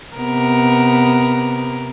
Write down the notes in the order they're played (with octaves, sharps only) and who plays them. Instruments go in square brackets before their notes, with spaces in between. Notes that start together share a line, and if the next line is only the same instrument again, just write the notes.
[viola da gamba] C3 B3 A#4